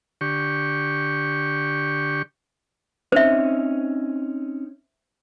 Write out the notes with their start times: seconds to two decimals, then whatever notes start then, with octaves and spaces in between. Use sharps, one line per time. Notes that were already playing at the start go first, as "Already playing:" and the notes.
0.21 D3 G4 C#6
3.12 C4 C#4 D#4 C5 E5